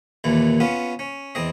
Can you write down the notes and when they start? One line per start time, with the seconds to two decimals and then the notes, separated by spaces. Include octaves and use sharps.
0.24 D#2 A#2 E3
0.60 B3 C#4 F4
0.99 C#4
1.35 E2 C4 D#5